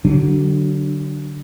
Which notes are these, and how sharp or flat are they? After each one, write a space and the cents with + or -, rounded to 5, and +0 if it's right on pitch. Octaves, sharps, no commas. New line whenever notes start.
D3 +0 F#3 +30 D4 +20